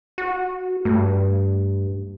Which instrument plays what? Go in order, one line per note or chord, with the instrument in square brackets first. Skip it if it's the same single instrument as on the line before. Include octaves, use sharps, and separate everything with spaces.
[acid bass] F#4
[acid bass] G2 [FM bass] A3